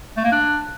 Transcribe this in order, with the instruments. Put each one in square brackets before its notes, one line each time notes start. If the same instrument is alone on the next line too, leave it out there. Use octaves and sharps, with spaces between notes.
[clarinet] A3
A#3
D4